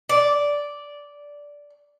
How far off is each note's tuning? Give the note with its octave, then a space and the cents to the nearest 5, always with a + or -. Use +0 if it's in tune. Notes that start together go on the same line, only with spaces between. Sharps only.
D5 -10